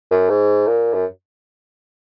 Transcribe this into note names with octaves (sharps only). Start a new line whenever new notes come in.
F#2
G#2
A#2
F#2